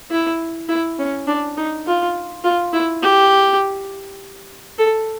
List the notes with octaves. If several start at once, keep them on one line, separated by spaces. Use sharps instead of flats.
E4
E4
C#4
D4
D#4
F4
F4
E4
G4
A4